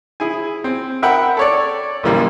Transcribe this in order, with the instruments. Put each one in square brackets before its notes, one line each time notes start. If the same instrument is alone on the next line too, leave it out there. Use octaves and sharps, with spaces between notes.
[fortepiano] E4 G#4 G#5
C4
A#4 E5 F#5 G5 B5
A4 C#5 D5
B1 F#2 E3 G3 A#3